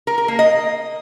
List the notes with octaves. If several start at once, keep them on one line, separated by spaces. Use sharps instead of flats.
A#4
A#4
A#3
D#5